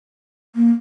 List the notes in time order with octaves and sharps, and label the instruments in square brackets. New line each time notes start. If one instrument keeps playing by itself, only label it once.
[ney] A#3